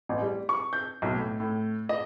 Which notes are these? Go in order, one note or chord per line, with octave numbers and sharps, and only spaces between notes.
A1
G3
C#6
G6
B1
A2
A2
D#5